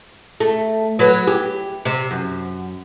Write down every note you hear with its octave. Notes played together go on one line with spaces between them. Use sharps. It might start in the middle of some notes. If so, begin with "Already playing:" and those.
A3
F#3 B3
G4
C3
F#2